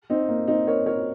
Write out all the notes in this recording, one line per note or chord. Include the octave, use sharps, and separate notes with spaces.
C4 D#4
A#3
C4 D#4
A#4 C#5
A#4 C#5